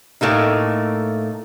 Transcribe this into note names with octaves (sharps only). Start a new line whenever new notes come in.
A2 A3 A#3 D#4